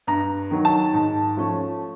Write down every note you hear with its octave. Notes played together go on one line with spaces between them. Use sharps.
G2 A#5
D#3 F#3
A5
G#2
F3 A3 C#4